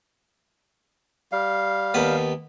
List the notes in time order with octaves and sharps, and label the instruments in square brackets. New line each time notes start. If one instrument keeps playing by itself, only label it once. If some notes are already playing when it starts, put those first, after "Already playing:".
[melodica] G3 F5
[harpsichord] D#2 B3